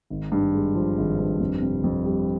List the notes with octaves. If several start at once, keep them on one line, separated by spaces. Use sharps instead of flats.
G#1
G2
G#3
F3
G#1
G2
F2
C3
F2
G3